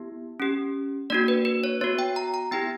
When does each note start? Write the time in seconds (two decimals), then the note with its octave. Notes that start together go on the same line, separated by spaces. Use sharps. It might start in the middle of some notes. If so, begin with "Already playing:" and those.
Already playing: B3 E4 G4
0.40 C#4 G4
1.10 A#3 D4 F#4 D5
1.28 B4
1.45 B4
1.64 C#5
1.81 B3 F#4 C#5
1.99 G5
2.16 A#5
2.34 A#5
2.51 B3 E4 G4 G5